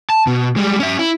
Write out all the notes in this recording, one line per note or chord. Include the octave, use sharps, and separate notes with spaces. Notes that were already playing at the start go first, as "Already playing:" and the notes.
A5
B2
G3 G#3
C#4 E5
E4